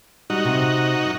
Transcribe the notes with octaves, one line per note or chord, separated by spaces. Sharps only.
G3 D#4 F#4
C3
F#2